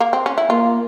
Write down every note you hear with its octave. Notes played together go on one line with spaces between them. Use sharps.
A#3
C4
C#4
E4
A#3 F4